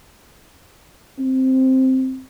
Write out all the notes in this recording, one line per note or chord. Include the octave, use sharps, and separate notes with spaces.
C4